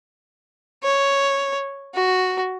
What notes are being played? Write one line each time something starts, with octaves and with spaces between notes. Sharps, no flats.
C#5
F#4